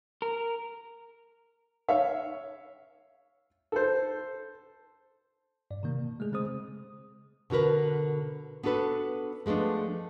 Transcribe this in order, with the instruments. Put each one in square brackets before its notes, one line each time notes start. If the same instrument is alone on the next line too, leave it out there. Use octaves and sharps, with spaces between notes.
[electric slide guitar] A#4
[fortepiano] C#5 E5 F5
A4 C5
[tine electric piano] G2 D5
C3 D#3 A#3
B2
G#3 A3 G#4
C#3 G#3 C4 G#4 C5 D#6
[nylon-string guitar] B2 D3 F#4 A#4 B4
B3 D4 F#4 A4 B4
F3 G#3 A3 B3 D4